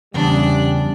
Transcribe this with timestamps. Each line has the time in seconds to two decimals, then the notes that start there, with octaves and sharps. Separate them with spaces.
0.14 E2 C#3 G3 D4 F#6